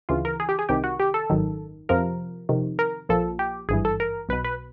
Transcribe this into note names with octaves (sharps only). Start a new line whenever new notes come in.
D2 C#3 E3 F4
A#4
G#4
G4
G#4
C2 C3 D#3 G4
F#4
G4
A4
G#1 F#2 D#3
F2 C3 F3 A#4
F2 C3 D#3
A#4
A#1 A#2 F3 A4
G4
G#1 G2 E3 G#4
A4
A#4
B1 B2 B4
B4